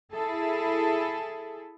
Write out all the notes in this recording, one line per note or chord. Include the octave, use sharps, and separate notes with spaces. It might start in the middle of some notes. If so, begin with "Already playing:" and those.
E4 G#4 A4